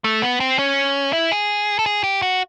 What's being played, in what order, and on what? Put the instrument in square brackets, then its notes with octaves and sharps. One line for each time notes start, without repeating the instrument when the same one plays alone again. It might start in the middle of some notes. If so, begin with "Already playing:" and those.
[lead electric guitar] A3
B3
C4
C#4
E4
G#4
A4
G#4
G4
F#4